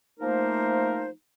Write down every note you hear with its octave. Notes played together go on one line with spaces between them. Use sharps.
F3 A3 A#3 D#4 A#4 C5